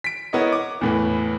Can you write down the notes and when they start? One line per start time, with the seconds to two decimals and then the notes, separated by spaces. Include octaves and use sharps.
0.04 B6 D7
0.33 B3 E4 A#4 C#5 D#5
0.53 D6
0.81 E2 A2 B4